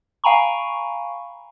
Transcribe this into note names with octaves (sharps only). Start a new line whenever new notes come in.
F5 G5 G#5 A#5 B5 C#6